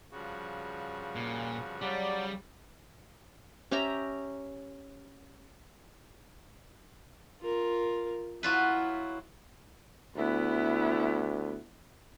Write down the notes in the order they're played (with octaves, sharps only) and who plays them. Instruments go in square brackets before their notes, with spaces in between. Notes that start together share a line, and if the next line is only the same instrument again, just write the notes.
[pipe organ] G2 F3 F#4 [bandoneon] C#3
[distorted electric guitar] A#2
[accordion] F#3 D5 [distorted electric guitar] G3
[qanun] C#4 G4 E5 A#5
[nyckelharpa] F4 A#4
[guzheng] F#3 F4 B4 [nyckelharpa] E4
[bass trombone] D2 [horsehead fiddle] B3 E4